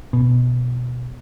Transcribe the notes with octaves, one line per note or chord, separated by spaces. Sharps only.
B2